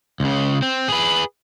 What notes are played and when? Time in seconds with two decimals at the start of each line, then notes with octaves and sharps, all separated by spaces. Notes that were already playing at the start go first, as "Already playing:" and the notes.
0.20 C#2 C#3
0.62 C4
0.88 G#4 B4